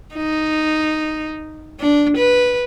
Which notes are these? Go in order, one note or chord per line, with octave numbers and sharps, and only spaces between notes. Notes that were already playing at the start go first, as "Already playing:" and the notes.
D#4
D4
B4